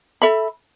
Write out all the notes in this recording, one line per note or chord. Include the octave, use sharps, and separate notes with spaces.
A4 E5 B5